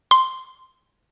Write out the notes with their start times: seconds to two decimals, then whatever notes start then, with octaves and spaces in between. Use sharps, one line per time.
0.11 C6